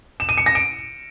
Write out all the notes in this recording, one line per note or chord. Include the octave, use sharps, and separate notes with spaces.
E7
D#7
C#7
A#6
D7